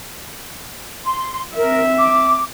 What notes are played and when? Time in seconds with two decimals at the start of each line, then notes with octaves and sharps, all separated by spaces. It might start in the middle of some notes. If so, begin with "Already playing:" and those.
1.05 C6
1.56 C4 A#4 E5
1.98 D6